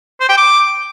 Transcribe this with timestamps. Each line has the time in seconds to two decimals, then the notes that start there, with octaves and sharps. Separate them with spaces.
0.20 C5
0.29 G5
0.37 D6